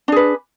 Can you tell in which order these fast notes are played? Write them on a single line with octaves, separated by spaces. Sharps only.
D4 G#4 B4